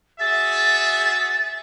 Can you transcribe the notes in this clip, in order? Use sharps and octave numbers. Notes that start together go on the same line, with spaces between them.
F#4 G#4 E5 A6